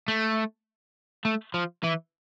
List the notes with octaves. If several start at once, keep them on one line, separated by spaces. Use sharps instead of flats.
A3
A3
F3
E3